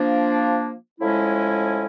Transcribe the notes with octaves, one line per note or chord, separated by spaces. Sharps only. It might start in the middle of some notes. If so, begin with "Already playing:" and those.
Already playing: F3 A#3 D4
A2 F3 G#3 C#4 E4